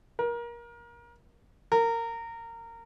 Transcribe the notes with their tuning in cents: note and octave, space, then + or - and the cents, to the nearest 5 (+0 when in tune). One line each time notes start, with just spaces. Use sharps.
A#4 +25
A#4 -20